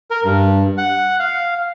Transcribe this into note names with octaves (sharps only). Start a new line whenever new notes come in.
A#4
G2
F#5
F5